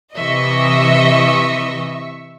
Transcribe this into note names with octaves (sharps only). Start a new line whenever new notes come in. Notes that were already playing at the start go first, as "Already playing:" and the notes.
C3 E3 D#5 E5 C#6